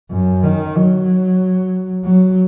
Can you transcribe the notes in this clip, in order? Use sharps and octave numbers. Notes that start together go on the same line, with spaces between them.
F#2
D#3
F#3
F#3